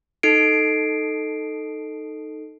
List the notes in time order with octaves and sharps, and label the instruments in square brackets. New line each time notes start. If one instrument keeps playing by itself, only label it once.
[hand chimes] D#4 A4 C7 D7